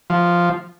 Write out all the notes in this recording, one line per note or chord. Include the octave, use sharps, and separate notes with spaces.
F3